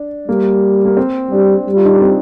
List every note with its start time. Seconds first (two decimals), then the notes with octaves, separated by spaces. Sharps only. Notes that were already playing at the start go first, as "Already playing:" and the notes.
Already playing: D4
0.28 G3 A#3
0.85 A#3
0.97 C4
1.31 G3 D4
1.66 G3
1.76 F4
1.85 D#4
1.93 D4
2.01 C4